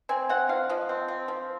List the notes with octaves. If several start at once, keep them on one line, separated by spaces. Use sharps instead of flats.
C4 G#5
C4 F#5
F3 F5
F3 D#5
C4
C4
F3